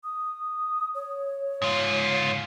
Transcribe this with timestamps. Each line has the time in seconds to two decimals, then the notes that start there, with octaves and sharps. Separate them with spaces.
0.04 D#6
0.95 C#5
1.62 G#2 F4